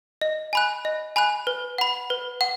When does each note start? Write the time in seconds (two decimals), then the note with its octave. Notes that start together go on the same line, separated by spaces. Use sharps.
0.21 D#5
0.53 G#5 B5 F#6
0.85 D#5
1.16 G#5 B5 F#6
1.47 B4
1.78 F#5 B5
2.10 B4
2.41 F#5